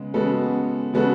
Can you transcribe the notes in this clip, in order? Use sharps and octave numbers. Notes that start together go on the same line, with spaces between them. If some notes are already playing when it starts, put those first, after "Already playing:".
Already playing: C#3 G#3 B3
C#3 G#3 B3 F#4 A4
C#3 G#3 B3 F#4 A4